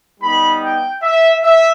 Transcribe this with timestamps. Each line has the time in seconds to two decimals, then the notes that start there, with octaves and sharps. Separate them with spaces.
0.20 G3 B3 D#4 B5
0.62 G5
1.02 E5
1.43 E5